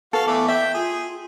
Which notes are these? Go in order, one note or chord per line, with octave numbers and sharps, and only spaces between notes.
F#4 A4 B4 F5
E3 A3 B3 D5
E5 G5
F4 G#4